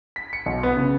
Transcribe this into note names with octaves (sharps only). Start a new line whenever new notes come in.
B6
C#7
B1
B3
C#3